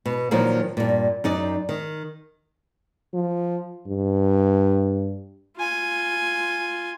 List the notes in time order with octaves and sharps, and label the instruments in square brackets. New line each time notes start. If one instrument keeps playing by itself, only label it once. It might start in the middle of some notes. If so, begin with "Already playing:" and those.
[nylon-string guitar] B2
A#2 D#3 F3 F#3 A#3
G2 A#2
F#2 D#4 D5
D#3
[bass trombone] F3
G2
[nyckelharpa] F4 G#5